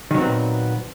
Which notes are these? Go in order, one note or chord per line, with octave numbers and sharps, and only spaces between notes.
A#2 D#3 F#3 B3 C4